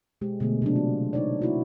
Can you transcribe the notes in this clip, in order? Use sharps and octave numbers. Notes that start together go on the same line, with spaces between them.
B2 G#3 G4
B2 D3 A3 G#4
C3 F#3 A#3 D4
F4
D4 D#4 C#5 D5
A#3 E4 F#4